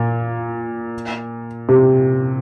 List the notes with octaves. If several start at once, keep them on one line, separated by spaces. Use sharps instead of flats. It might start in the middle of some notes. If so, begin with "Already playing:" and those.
Already playing: A#2
C3